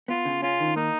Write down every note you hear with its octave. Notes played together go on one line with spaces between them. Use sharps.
B3 F4
C#3
C#4 F4
D#3
A#3 D#4